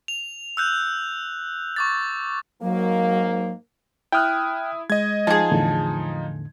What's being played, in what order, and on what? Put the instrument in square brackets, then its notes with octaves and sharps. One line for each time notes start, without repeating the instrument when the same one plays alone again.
[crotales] F7
E6 F#6 G6
C#6 D6 A6
[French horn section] G#2 A#3 [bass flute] F#3
[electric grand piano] E4 D#6 [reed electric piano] G5 F6 F#6
[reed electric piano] G#3 [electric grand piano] D#5 G#6
[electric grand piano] F3 D#4 [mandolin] G#4 A5
[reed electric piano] E2 A2 D3